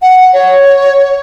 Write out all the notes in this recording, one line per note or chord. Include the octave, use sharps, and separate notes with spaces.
F#5
C#5